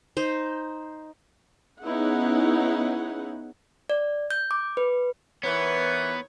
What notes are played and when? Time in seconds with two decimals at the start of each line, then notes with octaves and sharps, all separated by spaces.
0.17 D#4 C5
1.81 B3 C#4 D#4 E4 G#4 F#5
3.90 D5
4.31 G6
4.51 D6
4.77 B4
5.43 E3 B3 D#4 A#4 B4 C#5